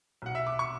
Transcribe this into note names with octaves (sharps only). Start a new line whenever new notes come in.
B1 B2 F#5
E5
D6
C#6